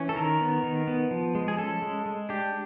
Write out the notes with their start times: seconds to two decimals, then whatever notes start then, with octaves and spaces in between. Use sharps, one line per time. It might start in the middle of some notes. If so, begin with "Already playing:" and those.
Already playing: E3 C#4
0.09 A4
0.16 D#3 A#4
0.41 B3
0.63 D#3
0.87 B3
1.11 F3
1.35 G#3
1.48 G#4
1.58 C#4 A4
1.82 G#3
2.06 G#3
2.29 D4 G4